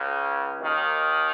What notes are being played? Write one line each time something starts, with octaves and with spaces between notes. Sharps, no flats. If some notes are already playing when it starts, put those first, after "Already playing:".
Already playing: C#2 C#3
D#2 D#3